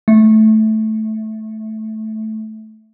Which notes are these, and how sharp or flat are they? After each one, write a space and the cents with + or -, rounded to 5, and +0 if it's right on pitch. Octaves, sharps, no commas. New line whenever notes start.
A3 -10